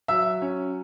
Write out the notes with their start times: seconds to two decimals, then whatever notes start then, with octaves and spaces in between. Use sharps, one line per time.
0.08 F#3 E5 E6
0.42 C#4